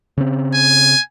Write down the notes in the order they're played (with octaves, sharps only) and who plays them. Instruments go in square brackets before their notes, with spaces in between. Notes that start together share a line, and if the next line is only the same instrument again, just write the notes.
[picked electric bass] C#3 C4
[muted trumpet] G#5